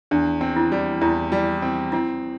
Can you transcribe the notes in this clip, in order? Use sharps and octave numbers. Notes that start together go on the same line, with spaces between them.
E2 D4
C4
E4
G3
E2 E4
G3
C4
C4 E4